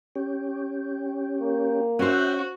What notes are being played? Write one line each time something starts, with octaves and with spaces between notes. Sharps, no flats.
C#4 G4
A#3
C#4 F#4 C5 E5 F#5 G5